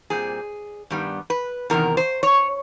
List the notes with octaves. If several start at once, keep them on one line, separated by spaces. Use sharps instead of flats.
A#2 G3 C4 G#4
G2 D#3 G3 B3
B4
E2 C3 D#3 A#4
C5
C#5